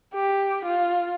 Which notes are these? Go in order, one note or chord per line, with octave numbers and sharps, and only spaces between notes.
G4
F4